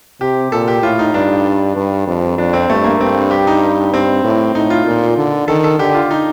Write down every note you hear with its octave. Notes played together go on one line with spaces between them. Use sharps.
C3 G4
A#2 A4
G4
A2 F4
D#4
G2 D4
G2
F2
F2 D4
C4
G2 A3
A#3
G2 C4
G4
D#4
G2 C4
A2
A2 D#4
F4
A#2
D3
D#3 A4
A4
D3 G4
F4
D#4